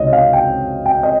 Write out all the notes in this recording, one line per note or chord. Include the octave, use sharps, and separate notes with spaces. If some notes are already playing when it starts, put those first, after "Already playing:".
Already playing: C#2 C3 D#3 C#5 D#5
F5
G5
G5
D#5